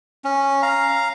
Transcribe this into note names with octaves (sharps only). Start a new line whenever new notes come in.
C#4
F5 A#5